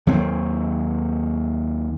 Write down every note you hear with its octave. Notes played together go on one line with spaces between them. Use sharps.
D#2 F#3 C4